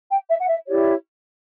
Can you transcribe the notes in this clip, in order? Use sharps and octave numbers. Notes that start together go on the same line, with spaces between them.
G5
E5
F#5
E5
E4 G4 C#5 D5